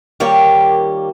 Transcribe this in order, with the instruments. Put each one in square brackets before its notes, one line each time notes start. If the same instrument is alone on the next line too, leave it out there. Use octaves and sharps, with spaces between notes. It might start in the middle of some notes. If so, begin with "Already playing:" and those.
[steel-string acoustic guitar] D#3 G3 A#3 F4 G4 C#5